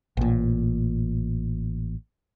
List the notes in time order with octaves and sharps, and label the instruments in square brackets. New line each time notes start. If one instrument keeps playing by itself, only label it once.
[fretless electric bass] A1 A#2